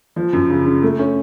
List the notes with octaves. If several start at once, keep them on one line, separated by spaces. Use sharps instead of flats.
F3
F#2
C#3
C#3
A3
C#4